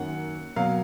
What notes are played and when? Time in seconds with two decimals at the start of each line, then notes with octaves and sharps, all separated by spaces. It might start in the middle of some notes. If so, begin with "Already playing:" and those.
Already playing: F#2 D#3 A#3 F#5
0.56 B2 F#3 A#3 F5